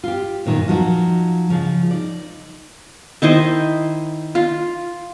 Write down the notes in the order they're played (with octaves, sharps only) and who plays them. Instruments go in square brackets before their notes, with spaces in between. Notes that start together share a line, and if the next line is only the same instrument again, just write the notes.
[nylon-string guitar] F4 G4
F#2 A#2 D#3
F3 F#3 D#4 F#4
C#3 F3
D#4 D5
[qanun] D#3 E4 C5 D#5
F4